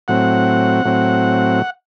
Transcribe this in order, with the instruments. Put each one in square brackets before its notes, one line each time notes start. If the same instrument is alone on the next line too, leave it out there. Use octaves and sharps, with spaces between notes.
[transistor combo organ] A2 F#3 C4 F#5
A2 F#3 C4